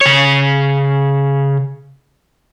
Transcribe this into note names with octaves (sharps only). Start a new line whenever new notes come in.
C#3 C#5